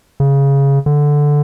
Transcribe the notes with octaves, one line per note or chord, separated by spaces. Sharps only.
C#3
D3